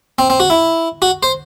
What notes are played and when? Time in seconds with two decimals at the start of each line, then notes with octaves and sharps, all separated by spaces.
0.19 C4
0.30 C4
0.40 F#4
0.50 E4
1.02 F#4
1.23 C5